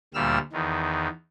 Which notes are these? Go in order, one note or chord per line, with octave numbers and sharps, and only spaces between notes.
D2 A#2 G3 E6 F6
E2 D#3